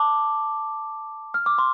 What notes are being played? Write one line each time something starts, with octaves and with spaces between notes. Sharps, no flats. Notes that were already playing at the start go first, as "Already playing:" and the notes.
Already playing: A5 D6
F6
D6
C6